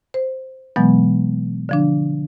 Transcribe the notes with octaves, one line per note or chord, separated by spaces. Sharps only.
C5
B2 E3 F#3 G#3 B3
D3 F3 D4